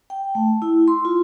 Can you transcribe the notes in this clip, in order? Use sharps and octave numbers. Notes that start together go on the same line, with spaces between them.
G5
A3
E4
C6
F4